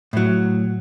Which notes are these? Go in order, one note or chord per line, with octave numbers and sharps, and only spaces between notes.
A2 F#3